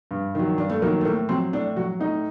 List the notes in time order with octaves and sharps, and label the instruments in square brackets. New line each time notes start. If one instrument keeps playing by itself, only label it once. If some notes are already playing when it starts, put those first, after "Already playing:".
[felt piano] G2
D#3 F#3
G2 D4
A3
D#3 F#3 A#3
A3
A2 A#3
F#3 C4
A2 D4
F#3 F#4
A2 D#4